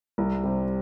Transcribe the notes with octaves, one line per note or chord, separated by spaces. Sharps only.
C2
C3 G3 C4